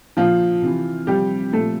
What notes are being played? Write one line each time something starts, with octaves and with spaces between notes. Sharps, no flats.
A#2 F3 F4
C3 E3
C3 F3 G3 G4
A#2 F3 A3 A4